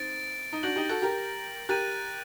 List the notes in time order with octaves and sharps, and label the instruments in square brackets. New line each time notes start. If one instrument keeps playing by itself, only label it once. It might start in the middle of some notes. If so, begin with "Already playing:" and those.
Already playing: [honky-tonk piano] C4 D#4 [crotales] A6 D7
[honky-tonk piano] D#4
[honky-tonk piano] D4 F#4 [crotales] G6 A#6 D7 F#7
[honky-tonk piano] D#4 G4
F#4 A4
G4 A#4
[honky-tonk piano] G4 A#4 [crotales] F#6 A6 D#7